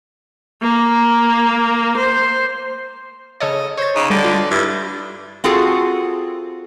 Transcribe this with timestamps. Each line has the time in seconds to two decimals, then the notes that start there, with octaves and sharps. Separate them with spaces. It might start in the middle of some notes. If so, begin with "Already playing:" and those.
0.62 A#3
1.97 C5
3.40 C#3 A4 C#5 D#5
3.77 C5 C#5 A6
3.96 C#3 D#4
4.10 D3 G3 D5
4.24 F4 B4
4.51 G2 E4
5.44 C4 F4 F#4 G#4 A4